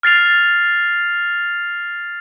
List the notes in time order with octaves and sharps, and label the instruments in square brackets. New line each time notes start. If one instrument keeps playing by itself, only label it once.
[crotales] F6 A6 C7 F7